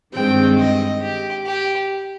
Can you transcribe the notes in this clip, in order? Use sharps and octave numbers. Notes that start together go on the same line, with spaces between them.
G2 D#3 G#3 C4 G5
D#5
G4
G4